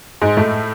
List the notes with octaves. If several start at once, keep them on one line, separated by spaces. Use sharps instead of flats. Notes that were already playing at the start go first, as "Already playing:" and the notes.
G#2 G#3
A2 A3